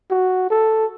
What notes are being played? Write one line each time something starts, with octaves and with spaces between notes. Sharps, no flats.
F#4
A4